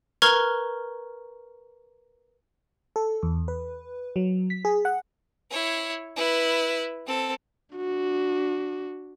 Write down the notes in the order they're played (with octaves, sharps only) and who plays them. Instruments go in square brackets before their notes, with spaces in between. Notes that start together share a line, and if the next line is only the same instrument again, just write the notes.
[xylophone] A#4 B4 A#5 C#6 F6 G#6
[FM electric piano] A4
E2
B4
F#3
B6
G#4
F#5
[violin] E4 C#5
E4 B4
C4 A4
[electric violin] D4 F#4